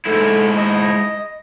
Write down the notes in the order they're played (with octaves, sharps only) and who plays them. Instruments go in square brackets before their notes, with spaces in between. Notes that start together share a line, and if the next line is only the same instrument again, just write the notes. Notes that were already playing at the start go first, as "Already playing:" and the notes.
[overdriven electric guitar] G#2 E4 [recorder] A4
[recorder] D#5